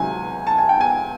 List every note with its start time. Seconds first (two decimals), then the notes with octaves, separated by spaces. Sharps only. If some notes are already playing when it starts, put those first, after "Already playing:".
Already playing: C#2 C3 D#3 F#3 G#5
0.47 A5
0.58 G#5
0.69 G5
0.81 G#5